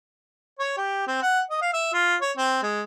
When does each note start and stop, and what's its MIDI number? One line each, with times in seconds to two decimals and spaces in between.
0.59 0.74 73
0.77 1.07 67
1.07 1.20 60
1.22 1.41 78
1.51 1.60 75
1.62 1.71 77
1.74 1.92 76
1.93 2.16 65
2.22 2.32 73
2.38 2.61 60
2.63 2.83 56